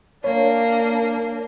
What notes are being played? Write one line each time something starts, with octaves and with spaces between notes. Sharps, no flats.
A#3 D4 C#5